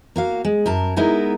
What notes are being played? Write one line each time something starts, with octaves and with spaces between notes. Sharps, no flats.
A#3 F#4 F5
G#3
F#2 A#4 A5
G#3 B3 D#4 E4 A#4